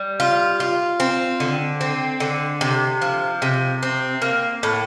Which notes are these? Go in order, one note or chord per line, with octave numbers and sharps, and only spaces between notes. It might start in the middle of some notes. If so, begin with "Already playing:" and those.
Already playing: G3
F4
F4
C4
D3
C4
D3
C3
F3
C3
C4
A#3
A2